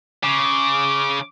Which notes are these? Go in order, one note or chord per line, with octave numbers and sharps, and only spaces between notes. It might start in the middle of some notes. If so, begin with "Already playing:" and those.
C#3 D6